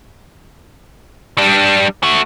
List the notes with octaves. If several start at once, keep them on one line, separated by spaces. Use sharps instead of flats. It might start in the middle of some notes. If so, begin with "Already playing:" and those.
G3 D4
A3 F#4